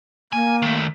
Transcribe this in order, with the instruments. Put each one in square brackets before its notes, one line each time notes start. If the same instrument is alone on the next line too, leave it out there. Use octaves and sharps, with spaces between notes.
[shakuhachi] A#3 [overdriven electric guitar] G#5
[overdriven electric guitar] D#3 A3